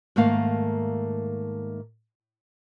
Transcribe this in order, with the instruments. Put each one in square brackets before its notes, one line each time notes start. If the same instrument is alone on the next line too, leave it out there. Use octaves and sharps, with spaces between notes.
[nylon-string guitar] G#2 D#3 A3 A#3 F5